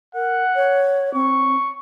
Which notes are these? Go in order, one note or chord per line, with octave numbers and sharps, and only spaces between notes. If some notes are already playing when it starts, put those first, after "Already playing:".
A#4 F#5
C#5
C4 C#6